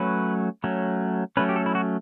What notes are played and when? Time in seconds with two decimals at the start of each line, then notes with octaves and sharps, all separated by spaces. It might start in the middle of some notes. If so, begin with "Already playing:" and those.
Already playing: F#3 A3 C#4 B4
0.64 F#3 A3 C#4
1.37 F#3 A3 C#4 B4
1.49 G4
1.56 A4
1.66 E4
1.75 F#4